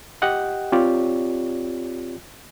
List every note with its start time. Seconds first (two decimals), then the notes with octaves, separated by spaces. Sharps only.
0.22 G4 D#5 F#5 G5
0.72 C4 F4 G4 C#5 D5